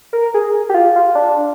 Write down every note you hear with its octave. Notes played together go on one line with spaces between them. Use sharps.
A#4
G#4
G4
F4
F4
D4